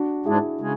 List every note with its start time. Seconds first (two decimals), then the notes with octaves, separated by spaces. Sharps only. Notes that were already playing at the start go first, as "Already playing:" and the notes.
Already playing: D4 F#4
0.25 G#2 G#3 D4 E4 G#4
0.61 C#3 G#3